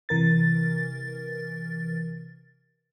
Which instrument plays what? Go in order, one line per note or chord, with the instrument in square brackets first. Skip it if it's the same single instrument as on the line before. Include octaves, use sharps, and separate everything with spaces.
[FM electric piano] C3 E3 A#4 A6